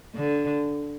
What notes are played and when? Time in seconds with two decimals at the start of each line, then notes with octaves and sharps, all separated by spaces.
0.15 D3